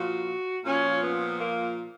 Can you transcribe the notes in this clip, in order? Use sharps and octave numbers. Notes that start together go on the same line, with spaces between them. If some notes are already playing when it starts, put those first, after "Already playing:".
Already playing: A#2 F3 F#4
A#2 F3 C#4
B3
A#3